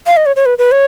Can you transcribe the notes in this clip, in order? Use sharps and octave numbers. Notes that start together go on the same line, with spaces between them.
F5
D#5
C#5
C#5
B4
B4
C#5